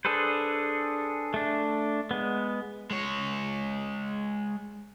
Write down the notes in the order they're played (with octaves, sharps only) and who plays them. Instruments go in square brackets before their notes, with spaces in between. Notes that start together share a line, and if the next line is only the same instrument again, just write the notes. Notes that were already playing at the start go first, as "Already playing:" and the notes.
[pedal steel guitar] D4 G#4 A4 B4 C5
A3 D4
G#3 B3
[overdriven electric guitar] G#3 C#5